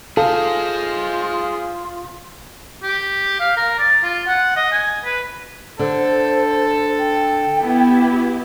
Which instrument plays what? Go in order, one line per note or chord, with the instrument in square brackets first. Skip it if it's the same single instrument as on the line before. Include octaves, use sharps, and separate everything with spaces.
[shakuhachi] F4 [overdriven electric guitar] G#4 C5 [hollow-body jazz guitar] A4 [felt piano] F5
[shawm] G4
F5
A#4
D5
F4
F#5
D#5
G#5
B4
[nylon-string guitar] D3 [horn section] A4 [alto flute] C5
[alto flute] G5
[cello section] B3 E4 G4